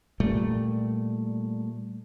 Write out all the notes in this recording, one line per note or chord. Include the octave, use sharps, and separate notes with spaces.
A#2 G3 A3